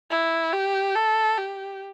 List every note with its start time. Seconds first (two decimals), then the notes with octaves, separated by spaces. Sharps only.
0.11 E4
0.53 G4
0.95 A4
1.38 G4